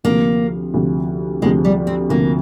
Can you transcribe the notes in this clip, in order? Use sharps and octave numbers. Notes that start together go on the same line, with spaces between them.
D2 C3 F3 A#3
D2 C3 F3
D2 C3 F3 G#3
G3
C4
D2 C3 F3 A#3